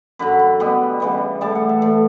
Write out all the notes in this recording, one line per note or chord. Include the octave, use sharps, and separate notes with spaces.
F#2 D3 F#3 B5
B5
B2 G3 B3
C#3 E3 G3 B3
A2 E3 G3 A5
F#5
E5
A2 E3 A3